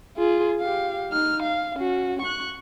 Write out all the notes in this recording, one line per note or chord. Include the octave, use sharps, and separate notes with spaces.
F4 G#4
G4 F5
D#4 F6
F5
C#4 F#4
C#6 F#6